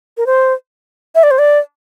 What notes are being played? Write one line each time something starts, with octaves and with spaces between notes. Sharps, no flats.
A#4
C5
E5
D5
C5
D5